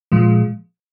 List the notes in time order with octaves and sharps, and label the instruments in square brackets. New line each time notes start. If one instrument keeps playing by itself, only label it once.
[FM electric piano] A#2 F3 G#3